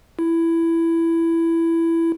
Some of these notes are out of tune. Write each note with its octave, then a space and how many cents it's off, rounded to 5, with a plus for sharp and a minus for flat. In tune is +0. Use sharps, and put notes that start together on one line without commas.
E4 +10